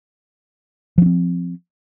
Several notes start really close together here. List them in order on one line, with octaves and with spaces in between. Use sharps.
F3 C#4 C4